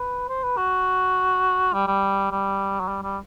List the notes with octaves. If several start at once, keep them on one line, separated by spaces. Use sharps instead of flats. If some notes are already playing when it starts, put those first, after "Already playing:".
Already playing: B4
C5
B4
F#4
G3
G3
G3
F#3
G3
G3